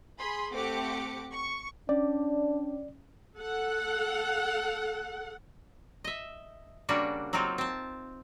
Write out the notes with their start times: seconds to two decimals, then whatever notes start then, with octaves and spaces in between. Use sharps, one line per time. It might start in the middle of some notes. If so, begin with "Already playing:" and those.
0.17 G#4 B5 C6
0.52 A3 C4 G4 F#5 D6 C#7
1.31 C#6
1.89 C#4 D4 D5
3.37 A4 F#5
6.04 D#5 E5
6.89 C#3 G3 A#3 D4 F#4
7.33 F#3 A#3 C4 D#4 F4
7.58 C4 A5